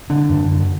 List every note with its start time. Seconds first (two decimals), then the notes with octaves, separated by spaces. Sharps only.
0.10 D3 D4
0.29 F#2 D3